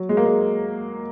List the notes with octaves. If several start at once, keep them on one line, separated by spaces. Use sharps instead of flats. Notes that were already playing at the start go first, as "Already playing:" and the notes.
Already playing: F#3
G#3
A#3
G#3